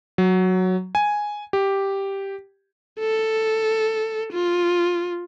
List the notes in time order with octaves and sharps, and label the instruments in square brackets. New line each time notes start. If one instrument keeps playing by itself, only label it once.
[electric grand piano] F#3
G#5
G4
[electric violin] A4
F4